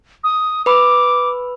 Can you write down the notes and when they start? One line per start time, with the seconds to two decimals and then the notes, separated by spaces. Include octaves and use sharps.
0.24 D#6
0.66 B4 B5 D6 E6